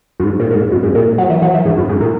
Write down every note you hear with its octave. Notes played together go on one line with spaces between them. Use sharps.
F#2
G#2
A#2
A#2
G#2
F#2
G#2
A#2
F#3
E3
F#3
E3
G#2
F#2
G#2
A#2